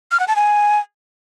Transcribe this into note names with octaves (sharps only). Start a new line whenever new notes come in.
F6
F#5
A5
G#5